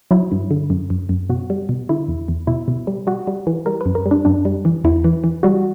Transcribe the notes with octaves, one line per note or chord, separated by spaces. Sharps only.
F#3 E4
G2
D3
F#2
F#2
F#2
B2 F#4
G3
B2
D3 E4
E2
E2
B2 E4
B2
G3
G3 F#4
G3
E3
G3 A#4
B4
F#2
A#4
G3
D4
F#2 D4
G3
E3
E2 E4
E3
E3
G3 F#4